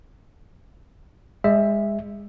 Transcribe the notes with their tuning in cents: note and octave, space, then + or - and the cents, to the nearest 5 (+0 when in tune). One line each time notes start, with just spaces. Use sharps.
G#3 -25 E5 +0